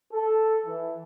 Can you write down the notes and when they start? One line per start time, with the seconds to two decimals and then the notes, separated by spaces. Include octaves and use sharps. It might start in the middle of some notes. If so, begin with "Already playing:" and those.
0.12 A4
0.66 E3